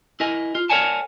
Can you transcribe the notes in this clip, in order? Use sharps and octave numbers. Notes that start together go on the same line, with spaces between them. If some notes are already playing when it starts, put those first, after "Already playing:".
E4 A#4 D#5 G#5
F4
A#4 C#5 D5 F#5 G#5 A5